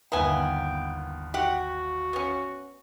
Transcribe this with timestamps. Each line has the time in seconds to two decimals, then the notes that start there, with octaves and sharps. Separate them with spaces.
0.12 G1 D#2 B3 E5 G5 G#5 A#5
1.34 F#4 G4 F#5
2.13 B3 C#4